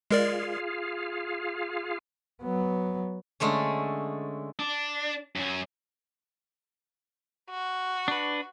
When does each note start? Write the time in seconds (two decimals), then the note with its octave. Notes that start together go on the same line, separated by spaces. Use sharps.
0.11 G#3 F4 G#4 A#4 D5 F5
2.42 F#3 B3
3.40 D3 G#3 A3 C#4
4.59 D4
5.36 F#2 C#4
7.50 F#4
8.08 D4 B4